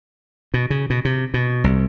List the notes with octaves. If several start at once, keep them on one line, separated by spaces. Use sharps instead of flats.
B2
C#3
B2
C3
B2
C2